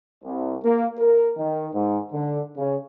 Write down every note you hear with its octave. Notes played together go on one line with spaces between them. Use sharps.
C2
A#3
A#4
D#3
G#2
D3
C#3